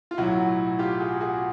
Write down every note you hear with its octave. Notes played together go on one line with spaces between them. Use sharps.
F4
B1 A2 F#3 E4 F#4
F4 G4
F#4 G#4
F#4 G#4